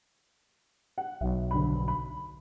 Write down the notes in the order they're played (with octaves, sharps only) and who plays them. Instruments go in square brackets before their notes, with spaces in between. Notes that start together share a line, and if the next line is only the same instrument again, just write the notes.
[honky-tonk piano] F#5
[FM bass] B1 [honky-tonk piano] E5
[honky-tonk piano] D2 G2 B5
B5